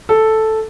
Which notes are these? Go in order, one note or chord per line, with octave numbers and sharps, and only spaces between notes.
A4